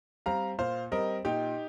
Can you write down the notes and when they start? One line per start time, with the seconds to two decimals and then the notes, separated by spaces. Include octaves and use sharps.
0.26 G3 C4 F5 A#5
0.59 A#2 C5 F5
0.92 G3 C4 A#4 D#5
1.25 A#2 D#4 G4